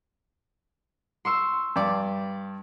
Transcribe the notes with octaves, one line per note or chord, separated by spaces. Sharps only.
C6 C#6 E6
G2 D5